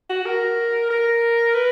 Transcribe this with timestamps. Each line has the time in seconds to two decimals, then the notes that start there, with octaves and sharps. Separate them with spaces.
0.10 F#4
0.26 A#4
0.90 A#4
1.54 B4